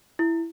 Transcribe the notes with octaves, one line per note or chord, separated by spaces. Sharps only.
E4